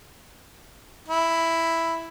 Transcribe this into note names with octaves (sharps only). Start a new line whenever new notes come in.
E4